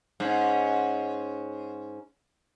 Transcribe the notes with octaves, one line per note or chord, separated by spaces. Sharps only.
G#2 C#4